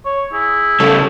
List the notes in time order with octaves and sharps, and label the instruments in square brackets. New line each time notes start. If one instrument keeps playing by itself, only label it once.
[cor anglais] C#5
[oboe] E4 [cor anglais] G#4
[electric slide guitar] C#3 G3 [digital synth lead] A4 [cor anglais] C#5